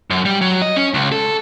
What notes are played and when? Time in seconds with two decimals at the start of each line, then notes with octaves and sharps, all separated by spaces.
0.10 F#2
0.26 G3
0.41 F#3
0.62 D#5
0.76 C#4
0.94 C#2
1.12 A4